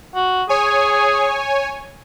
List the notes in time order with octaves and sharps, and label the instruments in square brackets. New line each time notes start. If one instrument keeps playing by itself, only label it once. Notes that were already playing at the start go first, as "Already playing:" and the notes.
[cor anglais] F#4
[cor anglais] G#4 [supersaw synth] C#5 G#5